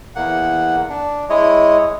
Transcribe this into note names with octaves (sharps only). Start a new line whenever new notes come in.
E2 A#3 F#5
D4
G#3 E4 C#5 D#5